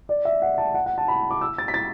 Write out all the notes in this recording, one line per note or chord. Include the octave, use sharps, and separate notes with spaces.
D5
E5
F#5
A5
F#5
F#5
A5
B5
D6
E6
A6
B6
A6